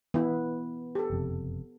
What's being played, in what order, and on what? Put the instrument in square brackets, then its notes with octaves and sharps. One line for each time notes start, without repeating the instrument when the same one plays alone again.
[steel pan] E3 E4 [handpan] B3
[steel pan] G4 A4
[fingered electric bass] F#1 F2 C3